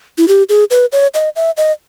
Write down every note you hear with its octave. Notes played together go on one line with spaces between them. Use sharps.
E4
G4
G#4
B4
C#5
D#5
E5
D#5